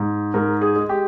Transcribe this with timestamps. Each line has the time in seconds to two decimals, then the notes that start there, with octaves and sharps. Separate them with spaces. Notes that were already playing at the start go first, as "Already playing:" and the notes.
Already playing: G#2
0.34 G#2 A#4
0.62 G#4
0.76 G#3
0.89 G4